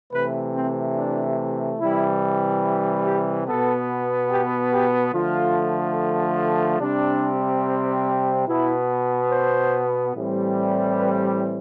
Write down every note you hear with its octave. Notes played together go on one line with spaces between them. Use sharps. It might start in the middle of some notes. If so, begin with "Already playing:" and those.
C3 E3 A3 B4
C4
D4
C3 E3 G3 E4
G4
B2 B3 A4
G4
G4
D3 F3 A3 F4
C3 G3 C4 D4
B2 B3 E4
C5
A2 E3 G3 C4
B4